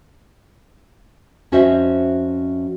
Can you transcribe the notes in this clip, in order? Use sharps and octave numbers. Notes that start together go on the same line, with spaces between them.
F2 C#4 F#4 C5 D#5 E5